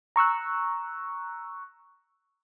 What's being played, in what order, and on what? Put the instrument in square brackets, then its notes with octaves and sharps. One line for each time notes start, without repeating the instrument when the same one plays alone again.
[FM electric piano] A#5 C#6 E6 F#6